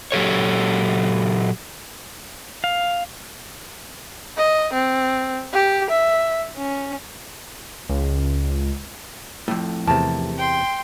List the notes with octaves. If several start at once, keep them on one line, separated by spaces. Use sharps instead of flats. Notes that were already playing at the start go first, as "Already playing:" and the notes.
A#2 F#3 G4 A4 C#5
F5
D#5
C4
G4
E5
C#4
C#2
F2 A2
E2 C3 A#4 A5
G5 C6